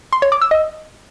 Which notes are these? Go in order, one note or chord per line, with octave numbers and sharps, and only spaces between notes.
C6
C#5
D6
E6
D#5